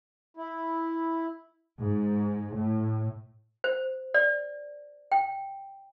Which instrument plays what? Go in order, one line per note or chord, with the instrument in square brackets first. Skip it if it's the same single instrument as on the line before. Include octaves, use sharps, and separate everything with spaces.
[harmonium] E4
[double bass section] G#2
A2
[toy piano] C5
D5
G5